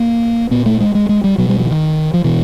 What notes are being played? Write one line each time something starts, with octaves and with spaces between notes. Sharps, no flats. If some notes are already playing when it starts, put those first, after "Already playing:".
Already playing: A#3
A#2 B3
A3
G#3
G#3
G#3
G3
B2 F#3
G3
F#3
E3
D#3
F3
B2 E3